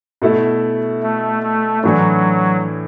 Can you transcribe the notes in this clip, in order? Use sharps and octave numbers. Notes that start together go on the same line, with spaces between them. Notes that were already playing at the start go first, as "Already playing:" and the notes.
B2 A3 E4
A3
A3
A2 E3 F#3 D4